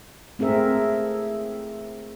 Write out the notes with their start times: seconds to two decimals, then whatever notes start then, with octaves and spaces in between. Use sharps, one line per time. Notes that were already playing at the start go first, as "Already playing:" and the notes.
0.39 A3 C4 G#4 A#4 E5